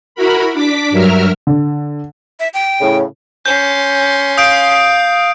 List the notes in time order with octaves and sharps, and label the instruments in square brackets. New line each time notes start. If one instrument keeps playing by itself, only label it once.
[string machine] E4 F#4 A#4 B5
D4 D6 B6
G2 F#3 A#4 E5 F6
[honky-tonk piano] D3
[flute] E5
G5
[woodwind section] A2 C#3
[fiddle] C#4 C6 [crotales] G6
[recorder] F5 [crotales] D#6 G6 D7